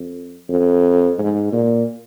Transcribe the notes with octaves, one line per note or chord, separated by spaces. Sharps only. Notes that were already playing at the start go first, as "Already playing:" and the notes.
Already playing: F2
F2
G#2
A#2